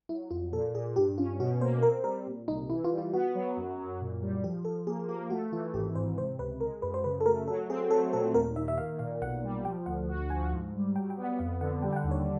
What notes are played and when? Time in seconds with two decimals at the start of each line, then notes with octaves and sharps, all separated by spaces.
0.09 F#3 E4
0.30 F2 F4
0.52 A#2 A4
0.75 A#2 G#4
0.96 G2 G4
1.18 C#4 F4
1.39 B2 F#4
1.61 A#3 C5
1.83 C4 A#4
2.04 G3 A#4
2.26 A#2
2.48 C2 D#4
2.70 E3 E4
2.84 F4
2.91 G3
2.98 F4
3.13 B3 F#4
3.35 F#3
3.57 F#2
3.78 F#2
4.01 A#2
4.22 G3
4.44 F3 G4
4.65 F3 A4
4.86 A#3 G#4
5.08 A#3 G4
5.30 A3 F#4
5.52 E3 F4
5.73 G#1 G4
5.95 G#2 C5
6.17 C3 C5
6.38 C#2 B4
6.60 G#3 A#4
6.82 F#2 B4
6.94 C5
7.04 C#3 B4
7.21 A4
7.26 A3 A#4
7.48 F#3 A4
7.69 C4 G#4
7.91 A3 A4
8.13 A#2 A4
8.34 D#2 A#4
8.56 D#3 E5
8.68 E5
8.78 A#3 F5
8.99 A#2 F5
9.21 B1 F#5
9.44 G3
9.65 F3 G5
9.86 D2 F#5
10.08 F#4
10.30 F3 G#5
10.52 G#2
10.74 G3
10.95 F#3 G5
11.10 G5
11.17 B3
11.24 F#5
11.39 F2 F5
11.60 D3 F#5
11.82 G3 G5
11.93 G5
11.96 F#5
12.03 D#2
12.11 C#5